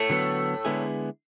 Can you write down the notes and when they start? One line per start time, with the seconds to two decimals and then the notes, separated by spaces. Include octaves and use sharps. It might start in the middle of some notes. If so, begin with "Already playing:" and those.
Already playing: A2 A3
0.10 D3 F#3 B3
0.65 D3 G#3 B3 E4 G#4